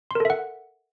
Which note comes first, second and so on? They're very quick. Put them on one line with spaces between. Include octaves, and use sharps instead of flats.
C6 A#4 A4 E5 F#5